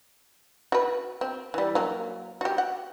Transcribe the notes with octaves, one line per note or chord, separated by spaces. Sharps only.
F#4 B4
C4
E3 G3
F#3 A#3
F#4 G4
F#5